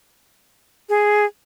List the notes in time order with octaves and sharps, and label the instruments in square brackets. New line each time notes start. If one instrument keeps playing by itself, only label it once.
[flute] G#4